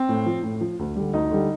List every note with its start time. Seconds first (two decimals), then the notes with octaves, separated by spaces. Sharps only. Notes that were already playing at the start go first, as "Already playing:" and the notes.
Already playing: C4
0.09 A2
0.26 F3
0.43 A2
0.61 F3
0.79 D2
0.96 D3 G3
1.13 D2 D#4
1.31 D3 G3